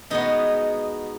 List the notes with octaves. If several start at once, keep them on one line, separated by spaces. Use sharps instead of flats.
B2 G#3 B3 D#4